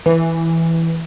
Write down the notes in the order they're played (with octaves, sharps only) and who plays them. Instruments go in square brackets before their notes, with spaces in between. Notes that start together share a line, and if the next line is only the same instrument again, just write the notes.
[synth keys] E3